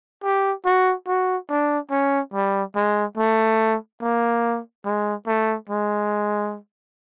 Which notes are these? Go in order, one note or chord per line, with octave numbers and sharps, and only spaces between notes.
G4
F#4
F#4
D4
C#4
G3
G#3
A3
A#3
G#3
A3
G#3